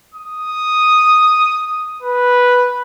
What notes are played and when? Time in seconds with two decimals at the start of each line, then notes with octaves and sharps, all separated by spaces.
0.14 D#6
2.03 B4